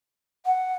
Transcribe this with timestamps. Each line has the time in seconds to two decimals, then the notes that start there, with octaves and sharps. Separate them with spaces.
0.46 F#5